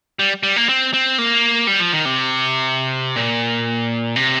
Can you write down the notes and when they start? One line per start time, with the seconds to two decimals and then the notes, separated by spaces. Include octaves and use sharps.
0.19 G3
0.43 G3
0.56 A#3
0.69 C4
0.94 C4
1.18 A#3
1.67 G3
1.80 F3
1.93 D#3
2.05 C3
3.16 A#2
4.16 C3